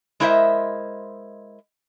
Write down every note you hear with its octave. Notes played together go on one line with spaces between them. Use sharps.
G#3 E4 A#4 C5 D#5 E5